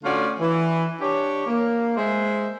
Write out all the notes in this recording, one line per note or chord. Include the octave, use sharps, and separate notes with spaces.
D3 A3 C#4 F4 F#4 D5
E3
D4 G4 C#5
A#3
G#3 C5 E5